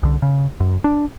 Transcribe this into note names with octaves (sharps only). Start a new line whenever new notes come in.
C2 D3
C#3
F#2
D4